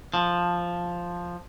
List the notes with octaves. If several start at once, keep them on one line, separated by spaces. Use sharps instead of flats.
F3